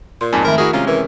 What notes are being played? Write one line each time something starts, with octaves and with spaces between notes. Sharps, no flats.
A#2 C6
F2 G#2 G#5 A5
D#3 A3 A#4 E5
E4 F#4 G#4 A#4
C3 G#3 C#4 F4 A#5
E3 A#4